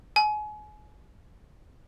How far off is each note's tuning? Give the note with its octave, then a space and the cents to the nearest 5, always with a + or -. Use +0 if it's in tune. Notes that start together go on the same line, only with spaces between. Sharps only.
G#5 +30